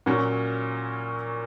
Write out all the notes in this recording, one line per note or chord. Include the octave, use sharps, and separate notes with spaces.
A#2 F#3 C#4